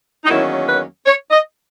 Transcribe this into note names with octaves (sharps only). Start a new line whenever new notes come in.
D#4
E2 D#3 F#3 A#3 C#4 E4
B4
C#5
D#5